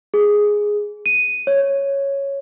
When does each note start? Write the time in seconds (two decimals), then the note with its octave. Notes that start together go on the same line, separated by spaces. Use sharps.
0.14 G#4
1.06 D#7
1.47 C#5